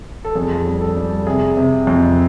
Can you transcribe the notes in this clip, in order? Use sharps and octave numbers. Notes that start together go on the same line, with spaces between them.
A4
F2 G#4
G3
A4
G3
C3 G#4
C3
F2